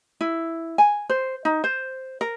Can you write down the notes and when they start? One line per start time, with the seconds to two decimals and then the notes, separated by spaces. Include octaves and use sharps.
0.21 E4
0.78 G#5
1.09 C5
1.45 D#4
1.64 C5
2.21 A#4